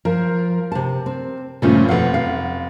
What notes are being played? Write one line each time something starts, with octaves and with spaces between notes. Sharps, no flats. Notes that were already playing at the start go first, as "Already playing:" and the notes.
F3 A#4
C3 A5
C4
G2 A#2 C#3 F3 A3 C#4
F1 B2 F3 F5 F#5
F5